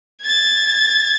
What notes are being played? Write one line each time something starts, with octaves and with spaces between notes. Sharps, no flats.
G#6 A6